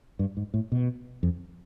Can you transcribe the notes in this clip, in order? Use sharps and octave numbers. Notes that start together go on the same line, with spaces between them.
G2
G#2
A2
B2
F2